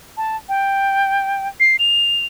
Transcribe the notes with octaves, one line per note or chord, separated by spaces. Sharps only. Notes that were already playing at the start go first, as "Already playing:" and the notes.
A5
G5
C7
F7